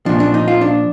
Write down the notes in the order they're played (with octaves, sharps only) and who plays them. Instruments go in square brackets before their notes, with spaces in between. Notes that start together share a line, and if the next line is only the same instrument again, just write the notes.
[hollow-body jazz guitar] A#2 F3 D4
D4
D#4
F4
D4